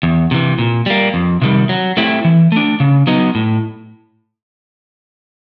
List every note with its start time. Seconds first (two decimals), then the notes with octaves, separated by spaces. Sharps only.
0.03 E2
0.31 C3 E3
0.59 A#2
0.86 G3 A#3
1.14 F2
1.42 C3 D#3 G3
1.69 F#3
1.97 A3 C4 E4 G4
2.25 E3
2.52 A3 D4
2.80 C#3
3.07 F#3 B3 D#4
3.35 A2